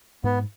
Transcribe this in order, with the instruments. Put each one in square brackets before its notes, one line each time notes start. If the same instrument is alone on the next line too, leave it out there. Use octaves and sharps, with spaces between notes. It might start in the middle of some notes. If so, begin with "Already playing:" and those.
[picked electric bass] G#2 [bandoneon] B3